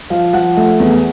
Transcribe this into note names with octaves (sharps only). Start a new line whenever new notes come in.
F3 F5
F3 F#5
A3
E2